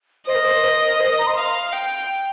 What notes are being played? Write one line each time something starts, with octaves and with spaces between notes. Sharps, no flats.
C5 D#5
A#4
C5
A#4
C5
A#5
C6
F5
G5